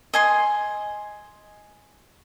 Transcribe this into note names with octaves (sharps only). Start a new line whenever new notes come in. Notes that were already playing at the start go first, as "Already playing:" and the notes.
D#5 G#5 C6